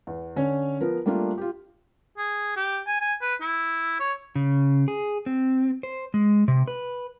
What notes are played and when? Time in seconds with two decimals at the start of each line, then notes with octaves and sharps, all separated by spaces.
0.07 E2
0.36 D3 C#4 C#5
0.81 F3 B3 A#4
1.06 G3 A3 A#3 D4 F4
1.38 F4 G4
2.18 G#4
2.56 G4
2.87 G#5
3.01 G#5
3.22 B4
3.41 E4
4.00 C#5
4.35 C#3
4.88 G#4
5.26 C4
5.83 C5
6.14 G#3
6.48 C3
6.68 B4